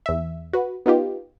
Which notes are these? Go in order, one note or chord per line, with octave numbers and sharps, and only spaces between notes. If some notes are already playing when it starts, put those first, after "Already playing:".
E2 E5
F#4 B4
B3 D#4 F4 G4